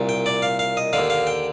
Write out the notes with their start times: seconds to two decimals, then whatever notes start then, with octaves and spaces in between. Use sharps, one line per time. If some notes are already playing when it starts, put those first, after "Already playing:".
Already playing: C2 A#2
0.09 G5
0.26 D5
0.42 F5
0.59 F5
0.77 D#5
0.93 D3 F5
0.98 D#2
1.10 F5
1.27 G5